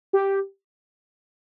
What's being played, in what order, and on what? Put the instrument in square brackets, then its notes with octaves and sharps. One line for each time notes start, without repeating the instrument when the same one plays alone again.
[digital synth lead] G4